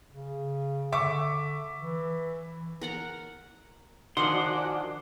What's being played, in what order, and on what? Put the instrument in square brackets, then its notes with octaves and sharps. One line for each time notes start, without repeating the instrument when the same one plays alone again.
[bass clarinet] C#3
[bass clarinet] D3 [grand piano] E5 C#6 D6
[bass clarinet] E3
[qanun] A#4 F#5 A#5
[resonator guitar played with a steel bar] D#3 F3 D4 [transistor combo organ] F#4 D5 [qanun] F#5 G#5 [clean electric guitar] C6